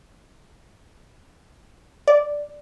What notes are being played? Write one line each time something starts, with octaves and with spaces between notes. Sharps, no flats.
D5